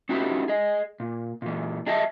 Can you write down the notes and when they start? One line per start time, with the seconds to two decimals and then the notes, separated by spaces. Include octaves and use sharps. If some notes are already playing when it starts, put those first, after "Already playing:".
0.09 C#4 D#4 E4 F#4 G4 B4
0.48 G#4 D#5
1.00 A#2
1.42 A#2 E3
1.86 D4 G#4 D#5 E5 A5